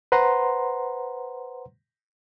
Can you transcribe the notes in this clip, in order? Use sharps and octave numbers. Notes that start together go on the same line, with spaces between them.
B4 C5 F#5 A#5 C6